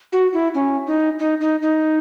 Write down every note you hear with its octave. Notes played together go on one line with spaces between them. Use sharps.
F#4
E4
C#4
D#4
D#4
D#4
D#4